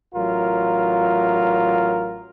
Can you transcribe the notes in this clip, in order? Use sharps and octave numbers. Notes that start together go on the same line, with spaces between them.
A1 F#3 F4 A#4